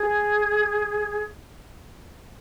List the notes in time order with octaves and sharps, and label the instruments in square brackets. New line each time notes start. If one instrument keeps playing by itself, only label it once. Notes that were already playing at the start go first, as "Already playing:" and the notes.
Already playing: [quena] G#4